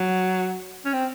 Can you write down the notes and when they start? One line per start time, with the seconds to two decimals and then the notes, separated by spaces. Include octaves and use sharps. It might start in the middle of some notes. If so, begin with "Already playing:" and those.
Already playing: F#3
0.85 C#4
0.93 C4